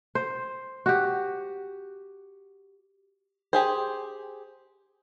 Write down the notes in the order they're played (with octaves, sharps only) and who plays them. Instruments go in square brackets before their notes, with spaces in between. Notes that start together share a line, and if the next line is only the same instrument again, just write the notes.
[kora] C5
F#4 G4
[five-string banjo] G4 G#4 C5